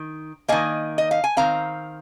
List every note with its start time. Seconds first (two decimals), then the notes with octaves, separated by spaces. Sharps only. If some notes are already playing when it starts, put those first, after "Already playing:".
Already playing: D#3
0.48 D#3 A#3 D#5 G#5
0.98 D#5
1.11 F5
1.24 G#5
1.37 D#3 C4 F5 A#5